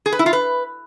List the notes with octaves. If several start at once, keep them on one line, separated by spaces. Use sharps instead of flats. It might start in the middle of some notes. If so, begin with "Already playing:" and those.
G#4
B4
E4
F4
B4